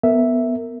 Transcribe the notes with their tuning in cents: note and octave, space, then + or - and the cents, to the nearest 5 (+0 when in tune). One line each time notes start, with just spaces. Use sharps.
B3 +0 A#4 -25 E5 +0